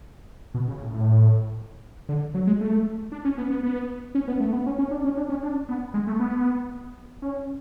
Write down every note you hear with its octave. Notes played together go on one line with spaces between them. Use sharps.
B2
C#3
A2
A2
D3
F#3
G#3
A3
D4
C#4
B3
B3
B3
C#4
B3
A3
B3
C#4
C#4
D4
C#4
D4
C#4
D4
B3
G#3
A3
B3
C#4